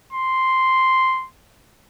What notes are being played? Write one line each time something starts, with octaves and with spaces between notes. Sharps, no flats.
C6